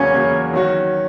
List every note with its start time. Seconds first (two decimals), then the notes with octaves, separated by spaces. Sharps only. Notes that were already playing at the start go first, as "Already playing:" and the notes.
Already playing: E2 C#3 F#3 A#3 C#4
0.13 E2 C#3 F#3 A#3
0.53 D#3 F#3 C#4 F#4